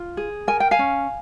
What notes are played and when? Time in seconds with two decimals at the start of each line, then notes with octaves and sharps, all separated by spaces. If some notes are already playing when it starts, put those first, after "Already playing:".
Already playing: F4
0.17 G#4
0.47 A#4 G#5
0.60 G5
0.71 F5 G#5
0.79 C#4